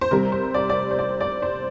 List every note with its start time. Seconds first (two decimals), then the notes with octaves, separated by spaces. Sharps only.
0.01 C5
0.11 C3 G3 A#4
0.32 C5
0.54 D5
0.70 D5
0.91 C5
0.99 D5
1.21 D5
1.42 C5